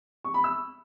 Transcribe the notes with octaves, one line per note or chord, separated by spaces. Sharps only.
C#6
B5
E6